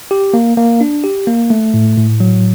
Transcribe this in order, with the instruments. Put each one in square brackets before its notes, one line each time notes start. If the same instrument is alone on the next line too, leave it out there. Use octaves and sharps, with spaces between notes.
[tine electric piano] G4
A#3
A#3
D4
G4
A#3
A3
A2
A2
F#3